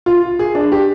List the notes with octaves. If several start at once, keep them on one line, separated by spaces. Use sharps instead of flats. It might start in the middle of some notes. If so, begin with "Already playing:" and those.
F4
G#4
D4
G4